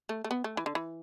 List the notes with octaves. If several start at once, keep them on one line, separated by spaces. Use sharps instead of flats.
A3
A3
B3
A3
E3
D3
E3